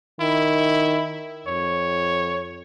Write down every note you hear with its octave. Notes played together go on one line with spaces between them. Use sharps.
D#3 E4
F2 C#5